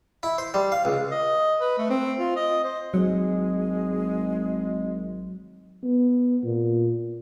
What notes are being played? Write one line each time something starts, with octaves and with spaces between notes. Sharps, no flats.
E4
C5
G3
F5
C#2
D#5
B4
A3
C4
F4
D#5
C5
G#1 F#3 G#3
B3
A#2